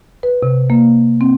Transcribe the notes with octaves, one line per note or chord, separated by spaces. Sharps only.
B4
C3
A#3
C4